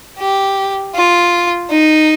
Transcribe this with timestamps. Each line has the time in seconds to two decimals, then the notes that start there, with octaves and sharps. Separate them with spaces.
0.19 G4
0.96 F4
1.71 D#4